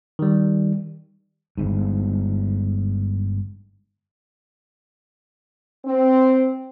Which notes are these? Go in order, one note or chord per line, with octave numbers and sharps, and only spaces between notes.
D#3 G3
G1 G#2
C4